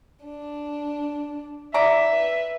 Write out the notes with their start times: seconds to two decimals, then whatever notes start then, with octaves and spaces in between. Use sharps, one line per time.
0.24 D4
1.74 E3 D5 E5 A#5
2.09 B4